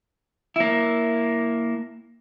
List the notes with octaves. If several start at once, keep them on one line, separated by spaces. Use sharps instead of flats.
A#3 E4